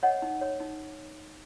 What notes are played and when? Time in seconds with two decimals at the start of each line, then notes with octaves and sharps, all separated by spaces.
0.03 C#5 D#5 F#5
0.22 D#4
0.41 C#5
0.60 D#4